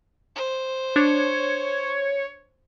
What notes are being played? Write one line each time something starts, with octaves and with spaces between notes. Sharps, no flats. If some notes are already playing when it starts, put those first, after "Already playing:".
C5
D4 C#5